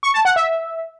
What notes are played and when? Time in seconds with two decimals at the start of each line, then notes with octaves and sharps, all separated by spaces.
0.03 C#6
0.14 A5
0.25 F#5
0.36 E5